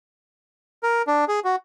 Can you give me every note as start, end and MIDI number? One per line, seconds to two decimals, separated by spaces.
0.83 1.02 70
1.07 1.25 62
1.28 1.40 68
1.45 1.56 66